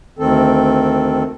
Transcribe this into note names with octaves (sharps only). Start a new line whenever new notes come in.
D2 D#3 C4 A4